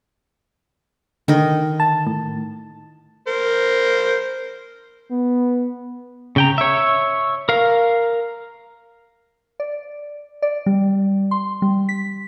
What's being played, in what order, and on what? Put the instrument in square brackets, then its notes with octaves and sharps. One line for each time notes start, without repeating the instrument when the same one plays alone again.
[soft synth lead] D3 [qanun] D#3 D#5
[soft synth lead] A5
A2
[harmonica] A#4 C5
[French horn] B3
[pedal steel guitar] C#3 G5 A#5
C#5 E5
A#4 F5
[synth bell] D5
D5
G3
C6
G3
B6